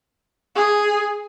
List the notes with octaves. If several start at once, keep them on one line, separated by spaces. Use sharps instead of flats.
G#4